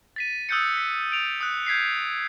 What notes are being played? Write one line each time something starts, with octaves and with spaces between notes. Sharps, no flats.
A6 B6 D#7
D#6 E6 F#6 G6 A6 C#7
B6
D7 F7
D#6 F#6
G6 G#6 B6 C7